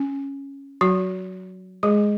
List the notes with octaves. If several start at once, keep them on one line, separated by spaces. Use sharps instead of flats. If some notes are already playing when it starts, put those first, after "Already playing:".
Already playing: C#4
F#3 F#4
G#3 G#4